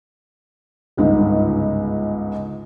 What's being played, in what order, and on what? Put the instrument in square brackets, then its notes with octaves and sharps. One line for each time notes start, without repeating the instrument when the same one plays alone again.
[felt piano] G1 C#2 G#2